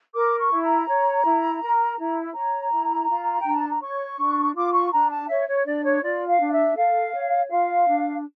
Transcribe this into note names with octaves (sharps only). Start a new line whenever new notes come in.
A#4 D6
C#6
E4
A#5
C#5
E4
A#4
E4
C#5 A#5
E4
F4
D4 G5
A5
A#5
C#5 C#6
D4
F4 D6
C#6
D4 A#5
A5
C#5 E5
C#5
D4 D5
C#5
F4 D5
F5
D4
E5
A4 F5
C#5
F4 F5
D4